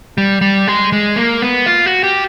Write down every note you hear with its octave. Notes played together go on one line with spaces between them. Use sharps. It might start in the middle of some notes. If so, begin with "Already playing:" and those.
G3
G3
G#3
G#3
A#3
B3
F4
F#4
G4